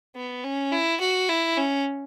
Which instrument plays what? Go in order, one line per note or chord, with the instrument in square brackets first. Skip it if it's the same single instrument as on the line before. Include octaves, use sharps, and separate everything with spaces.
[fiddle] B3
C#4
E4
F#4
E4
C#4